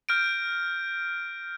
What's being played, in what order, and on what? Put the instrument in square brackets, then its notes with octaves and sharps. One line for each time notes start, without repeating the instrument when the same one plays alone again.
[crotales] F6 G6 A#6 D7